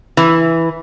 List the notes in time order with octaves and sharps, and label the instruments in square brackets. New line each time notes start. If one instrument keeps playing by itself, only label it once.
[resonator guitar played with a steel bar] E3